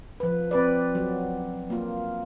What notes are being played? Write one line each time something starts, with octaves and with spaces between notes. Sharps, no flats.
F3 B4
C4 B4 D5
F#3
A#3 F4